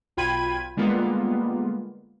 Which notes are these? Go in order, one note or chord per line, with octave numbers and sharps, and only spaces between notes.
B1 F4 G5 B5 G#6 D#7
D3 G3 G#3 A#3 B3 F4